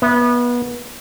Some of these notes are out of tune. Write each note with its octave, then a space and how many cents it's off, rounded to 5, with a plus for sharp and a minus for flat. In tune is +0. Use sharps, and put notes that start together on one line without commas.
B3 -25 E5 +0